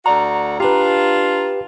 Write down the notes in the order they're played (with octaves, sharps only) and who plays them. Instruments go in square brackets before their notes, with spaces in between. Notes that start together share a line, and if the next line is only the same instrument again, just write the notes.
[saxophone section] D2 F#4 D5 [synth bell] A#5
[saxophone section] D4 F4 [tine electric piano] G4 B4